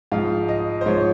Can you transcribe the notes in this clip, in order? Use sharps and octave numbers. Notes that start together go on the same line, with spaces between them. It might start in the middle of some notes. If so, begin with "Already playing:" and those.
G#2 F3 F5
D#5
C5
G#2 F3 C#5